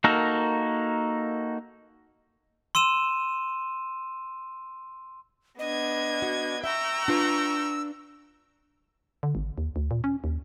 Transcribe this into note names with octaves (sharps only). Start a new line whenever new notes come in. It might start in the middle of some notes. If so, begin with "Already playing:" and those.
A#3 D#4 F#4 A4 A#4
C6 E6 D#7 E7
B3 D4 D#5 G#6
F#4
E5 G5 A#5 C#6 E6
D4 F4 B4
D3
G#1
D#2
D2
A#2
C#4
D#2